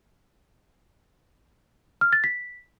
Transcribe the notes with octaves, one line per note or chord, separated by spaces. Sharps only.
F6
A6
B6